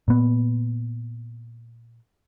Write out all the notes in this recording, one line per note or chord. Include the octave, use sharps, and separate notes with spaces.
A#2 B3